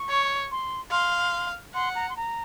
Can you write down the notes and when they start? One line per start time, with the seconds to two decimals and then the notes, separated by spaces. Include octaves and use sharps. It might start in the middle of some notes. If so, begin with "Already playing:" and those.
Already playing: C#6
0.10 C#5
0.51 C6
0.91 F5 C6
1.74 F#5 C6
1.95 A#5
2.09 C6
2.17 A#5